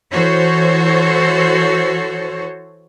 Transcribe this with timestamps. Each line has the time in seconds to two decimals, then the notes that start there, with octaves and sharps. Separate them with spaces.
0.11 E3 F#4 A4 C5 C#5